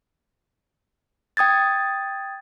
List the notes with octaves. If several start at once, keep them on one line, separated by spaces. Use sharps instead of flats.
G5 D#6 G#6 A6